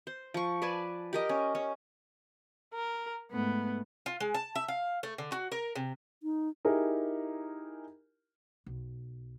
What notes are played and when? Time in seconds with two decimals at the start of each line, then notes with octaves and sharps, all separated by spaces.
0.07 C5
0.34 F3 C#6
0.62 B4 D5 G#5 A5
1.13 G4 A#4 D#5
1.29 C#4
1.55 C#4
2.74 A#4
3.32 G#2 A3 B3
4.06 F4
4.20 G#3
4.34 A5
4.55 E5
4.68 F5
5.03 A3
5.18 D3
5.32 F#4
5.52 A#4
5.76 C3
6.23 D#4
6.65 D#4 E4 G4 G#4 A#4
8.66 B1